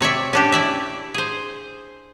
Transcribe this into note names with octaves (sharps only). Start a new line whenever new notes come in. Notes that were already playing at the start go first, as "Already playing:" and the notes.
C3 C#5 D5 E5
C#4 D4 G4
E4 D5 E5
G#4 C5